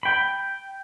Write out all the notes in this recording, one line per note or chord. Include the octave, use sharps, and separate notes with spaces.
G5 B5